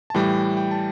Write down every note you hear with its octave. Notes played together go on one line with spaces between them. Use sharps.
A5
A2 E3 G3 G5
G5
A5